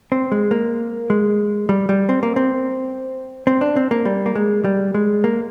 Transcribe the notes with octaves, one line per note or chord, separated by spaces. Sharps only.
C4
G#3
A#3
G#3
G3
G3
C4
A#3
C4
C4
D4
C4
A#3
G3
A#3
G#3
G3
G#3
A#3